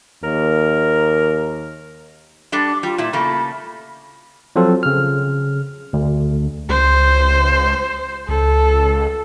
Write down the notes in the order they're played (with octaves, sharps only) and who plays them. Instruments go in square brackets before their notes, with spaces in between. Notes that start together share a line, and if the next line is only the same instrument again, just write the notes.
[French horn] D#2 [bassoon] A#4
[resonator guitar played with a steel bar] G3 D4 A4
[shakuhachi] D6
[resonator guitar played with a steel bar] G3 [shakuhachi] F4
[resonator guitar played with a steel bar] A#2 E4
[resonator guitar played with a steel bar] C#3 A3 A#3 [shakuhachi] B5
[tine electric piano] F3 F#3 C4 F4 A4
C#3 F6
D2
[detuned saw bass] C#2 [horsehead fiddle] C5
[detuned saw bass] C#2 [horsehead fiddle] A4